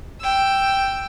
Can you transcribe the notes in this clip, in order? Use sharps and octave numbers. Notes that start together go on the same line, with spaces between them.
G5 E6